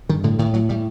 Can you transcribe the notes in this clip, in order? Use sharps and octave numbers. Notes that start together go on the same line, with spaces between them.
G2 D#3
A2 D3
A2 D#3
A2 F#3
A2 G3